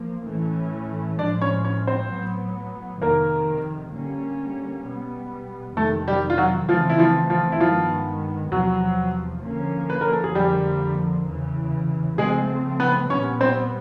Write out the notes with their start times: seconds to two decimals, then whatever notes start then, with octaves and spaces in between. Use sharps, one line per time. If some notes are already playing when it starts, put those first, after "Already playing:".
Already playing: F3 A#3
0.27 A2 E3 A3 C#4
1.19 A2 F3 G#3 D4 D5
1.42 C#4 C#5
1.64 C#4 C#5
1.87 C4 C5
2.10 A2 F#3 B3
3.02 F2 C3 D#3 A#3 A#4
3.94 D3 G3 A#3 C#4
4.86 B2 G3 B3
5.77 F2 C3 D#3 A3 A4
6.08 G3 G4
6.30 F4
6.38 F#3 F#4
6.69 C#3 E3 F3 A3 C4 F4
6.90 E4
6.99 F3 F4
7.30 F3 F4
7.52 E4
7.60 G2 D#3 F3 G#3 B3 F4
8.52 E2 C3 F3 F#3 F#4
9.43 D3 F3 A#3 C#4
9.90 B4
10.01 A#4
10.12 A4
10.24 G#4
10.35 F2 D3 F3 G3 A#3 G4
11.27 E2 C#3 E3
12.18 C#3 F3 G#3 A3 C4 G#4
12.80 B3 B4
13.10 A#2 G3 B3 C#4 C#5
13.41 C4 C5